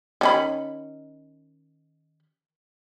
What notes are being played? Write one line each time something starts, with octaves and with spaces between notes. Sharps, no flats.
D#3 C#4 B5